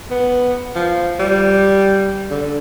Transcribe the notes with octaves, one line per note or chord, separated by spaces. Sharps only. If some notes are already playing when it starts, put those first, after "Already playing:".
B3
F3
G3
D3